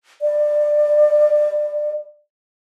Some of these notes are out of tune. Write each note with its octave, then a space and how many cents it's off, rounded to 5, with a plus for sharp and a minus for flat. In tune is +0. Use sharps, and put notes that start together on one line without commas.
D5 +20